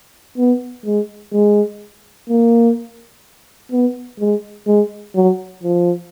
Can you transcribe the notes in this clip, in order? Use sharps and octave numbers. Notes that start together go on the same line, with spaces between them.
B3
G#3
G#3
A#3
B3
G#3
G#3
F#3
F3